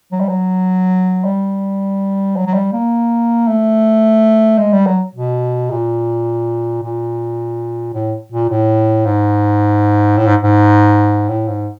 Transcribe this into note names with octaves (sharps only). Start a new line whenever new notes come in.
F#3
G3
F#3
G3
F#3
F#3
G3
A#3
A3
G#3
G3
F#3
B2
A#2
A#2
A2
A#2
A2
G#2
A2
G#2
G#2
A2
G#2